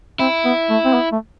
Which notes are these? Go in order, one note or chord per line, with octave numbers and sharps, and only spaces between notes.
C4 E4
B3
A3
C4
B3
A3